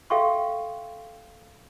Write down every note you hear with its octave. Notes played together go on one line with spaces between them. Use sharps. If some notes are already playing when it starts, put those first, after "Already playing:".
A4 E5 F5 G5 C6 C#6